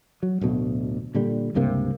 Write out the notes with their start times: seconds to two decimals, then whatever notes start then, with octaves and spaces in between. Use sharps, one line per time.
0.23 F#3
0.41 D1 D2 B2
1.14 A#2 D3 G3
1.55 C#2 G2 C3 A#3